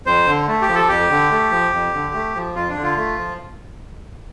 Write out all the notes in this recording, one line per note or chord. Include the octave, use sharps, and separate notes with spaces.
F2 C5
D3
A3
G4
F3
A4
F2 G4
D3
A3
F3
F2
D3
A3
F3
F2 F4
D4
D3
F4
A3
F3